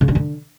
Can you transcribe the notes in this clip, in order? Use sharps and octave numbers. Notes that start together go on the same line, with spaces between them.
C#3
D4
D3